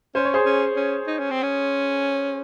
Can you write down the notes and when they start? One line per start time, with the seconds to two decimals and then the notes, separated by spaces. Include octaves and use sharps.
0.15 C#4 C5
0.25 C#5
0.34 G#4 C5
0.45 C#4
0.77 C#4
1.07 D#4
1.19 C#4
1.31 C4
1.43 C#4